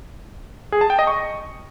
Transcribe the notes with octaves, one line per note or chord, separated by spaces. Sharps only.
G#4
A5
G5
D#5
C#6